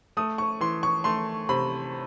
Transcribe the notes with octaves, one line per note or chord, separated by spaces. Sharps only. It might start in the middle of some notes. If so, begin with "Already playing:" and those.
A3 D#6
C#6
E3 C6
C#6
A3 C6
C3 B5